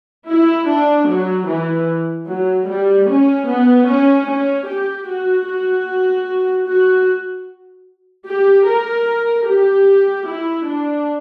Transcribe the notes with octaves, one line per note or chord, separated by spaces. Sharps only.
E4
D4
F#3
E3
F#3
G3
C#4
B3
C#4
C#4
G4
F#4
F#4
F#4
G4
A#4
G4
E4
D4